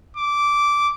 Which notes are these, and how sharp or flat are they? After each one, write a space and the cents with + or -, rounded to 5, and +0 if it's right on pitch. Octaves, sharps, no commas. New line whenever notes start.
D6 -10